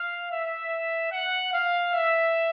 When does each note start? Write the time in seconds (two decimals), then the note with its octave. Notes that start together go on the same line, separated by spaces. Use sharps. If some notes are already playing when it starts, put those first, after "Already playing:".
Already playing: F5
0.29 E5
1.10 F#5
1.50 F5
1.91 E5